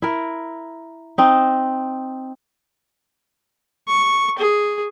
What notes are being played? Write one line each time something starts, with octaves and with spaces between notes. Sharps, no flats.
E4 A#4
C4 D#4
C#6
G#4